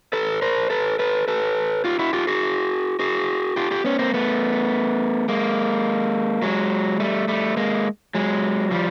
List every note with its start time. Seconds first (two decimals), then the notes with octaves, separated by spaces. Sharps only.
0.13 A4 B4
0.42 A#4 C5
0.70 A4 B4
0.99 A4 B4
1.28 A4 B4
1.85 F4 G4
1.99 E4 F#4
2.13 F4 G4
2.27 F#4 G#4
2.99 F#4 G#4
3.56 F4 G4
3.71 F4 G4
3.85 B3 C#4
3.99 A#3 C4
4.14 A3 B3
5.28 G#3 A#3
6.42 F#3 G#3
7.00 G3 A3
7.28 G3 A3
7.57 G#3 A#3
8.15 F#3 G#3
8.71 F3 G3